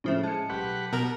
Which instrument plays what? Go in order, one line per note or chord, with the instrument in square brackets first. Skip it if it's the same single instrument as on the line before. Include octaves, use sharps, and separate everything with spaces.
[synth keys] A2 C#4 E4 [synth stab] C#3 F3 A3
[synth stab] G#3 [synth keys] A5 C#7
[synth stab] B1 [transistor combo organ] G4 B4 F#5
[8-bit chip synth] B2 A#4 [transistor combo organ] A#5